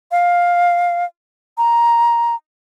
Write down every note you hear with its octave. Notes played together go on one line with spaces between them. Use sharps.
F5
A#5